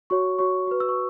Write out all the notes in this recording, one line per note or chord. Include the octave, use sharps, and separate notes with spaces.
F#4 C#5 C#6
F#4 C#5 C#6
F#4 B4
E6
C#6